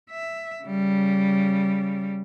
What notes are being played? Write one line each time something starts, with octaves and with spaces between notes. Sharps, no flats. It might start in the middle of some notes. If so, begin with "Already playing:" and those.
E5
C#3 G3